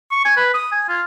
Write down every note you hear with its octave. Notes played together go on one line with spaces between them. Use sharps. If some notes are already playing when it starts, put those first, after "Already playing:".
C#6
G#5
B4
D#6
G#5
F4